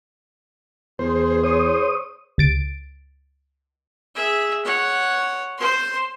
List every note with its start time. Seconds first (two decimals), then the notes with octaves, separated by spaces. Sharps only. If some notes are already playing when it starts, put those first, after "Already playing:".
0.99 E2 G#4 C5
1.43 C5 C#5 D#6
2.38 C#2 A6 D7
4.15 G#4 E5
4.65 C#5 F#5
5.57 C5 C6